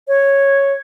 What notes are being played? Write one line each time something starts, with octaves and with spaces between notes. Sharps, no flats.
C#5